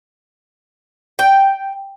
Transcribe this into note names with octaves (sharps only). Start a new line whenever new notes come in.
G5